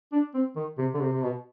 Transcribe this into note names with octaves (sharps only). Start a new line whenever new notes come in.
D4
C4
D#3
C3
D3
C3
C3
B2